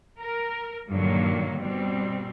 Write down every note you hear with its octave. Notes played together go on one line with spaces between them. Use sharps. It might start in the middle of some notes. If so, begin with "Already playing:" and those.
A#4
G2 A#2 D3 D#3 F#3 A#3
B2 G3 C4